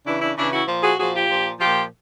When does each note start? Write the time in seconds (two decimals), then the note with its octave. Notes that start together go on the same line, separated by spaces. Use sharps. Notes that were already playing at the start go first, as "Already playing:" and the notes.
0.06 C#3 E3 D4 E4
0.21 D4 E4
0.37 C#3 E3 D4 E4
0.53 E4 F#4
0.67 A#2 F3
0.83 F#4 G#4
0.98 A#2 F3 F#4 G#4
1.14 F4 G4
1.29 A#2 F3
1.60 A#2 F3 F4 G4